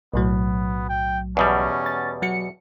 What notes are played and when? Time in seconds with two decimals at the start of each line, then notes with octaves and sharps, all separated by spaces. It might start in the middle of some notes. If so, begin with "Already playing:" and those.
0.13 B1 A2 F#3 B3
0.89 G5
1.37 E2 B2 G3 C#4
1.86 A6
2.22 F#3 F#4 C#7